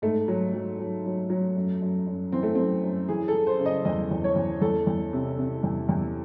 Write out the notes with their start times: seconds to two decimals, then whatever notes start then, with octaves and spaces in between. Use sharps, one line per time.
0.02 G#2 A3
0.28 F#3
0.53 F#3
0.79 F#3
1.05 F#3
1.30 F#3
1.56 F#2
1.82 F#2
2.07 F#2
2.32 E3 C4
2.43 A3
2.55 F#2 C4
2.84 F#2
3.08 E3 G#4
3.28 A4
3.34 E3
3.47 C5
3.59 C#3
3.66 D#5
3.85 E2 D#5
4.11 E2
4.24 C#5
4.36 E2
4.62 E2 A4
4.87 E2
5.13 C3
5.38 C3
5.63 E2
5.89 E2